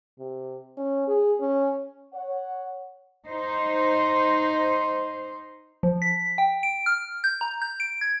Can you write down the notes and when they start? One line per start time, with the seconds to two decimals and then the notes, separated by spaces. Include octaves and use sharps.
0.18 C3
0.77 C#4
1.08 G#4
1.40 C#4
2.13 C#5 F#5
3.26 D#4 C5
5.83 F3
6.02 B6
6.38 G5
6.63 D7
6.86 F6
7.24 G6
7.41 A#5
7.62 G6
7.80 D7
8.01 G#6